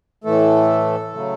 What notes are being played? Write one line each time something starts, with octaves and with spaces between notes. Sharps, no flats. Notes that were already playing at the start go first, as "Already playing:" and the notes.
A2 E3 A3 A4
C#3 F#3 A3